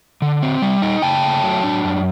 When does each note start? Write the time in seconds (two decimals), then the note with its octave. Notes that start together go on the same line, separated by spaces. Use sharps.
0.22 D3
0.42 C4
0.62 G3
0.82 D#4
1.02 C#3 G5 A5
1.22 A3
1.44 F#3
1.64 D4
1.84 F#2